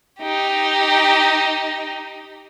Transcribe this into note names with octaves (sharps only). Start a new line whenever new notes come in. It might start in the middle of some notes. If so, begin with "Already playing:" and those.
D#4 G4